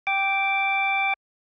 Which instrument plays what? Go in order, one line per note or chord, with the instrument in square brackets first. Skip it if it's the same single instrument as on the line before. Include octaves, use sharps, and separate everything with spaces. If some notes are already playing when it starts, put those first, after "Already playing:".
[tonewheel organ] G5 D6